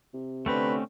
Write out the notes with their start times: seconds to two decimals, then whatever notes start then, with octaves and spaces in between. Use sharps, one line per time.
0.14 C3
0.46 D3 A3 C4 C#4 B4